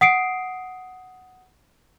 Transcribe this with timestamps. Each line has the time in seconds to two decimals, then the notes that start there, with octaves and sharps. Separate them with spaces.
0.01 F#5 D#6 C7 D7